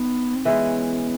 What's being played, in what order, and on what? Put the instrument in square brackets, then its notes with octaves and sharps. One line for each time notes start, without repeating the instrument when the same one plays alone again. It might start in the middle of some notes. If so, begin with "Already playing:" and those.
Already playing: [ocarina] B3 [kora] D#4
[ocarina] C4
[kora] E3 G#3 C#4 [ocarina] B3